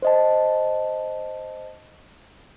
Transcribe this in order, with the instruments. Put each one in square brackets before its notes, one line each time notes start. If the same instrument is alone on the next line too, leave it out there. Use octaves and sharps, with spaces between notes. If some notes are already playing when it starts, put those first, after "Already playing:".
[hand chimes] C5 D#5 A5